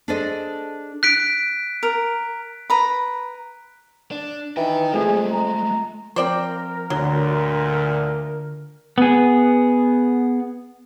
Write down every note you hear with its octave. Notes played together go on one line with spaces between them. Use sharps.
D4 G#4 A4 C5 D5 D#5
F#6 B6 D7
A#4
B4 A#5 B5
D4
D#3 E3 D#4 G5
F2 G#3 A3 G#4
A#5
F3 C4 A#4 C5 D5 G5
D2 A#2 D3 F#3
B3 G#4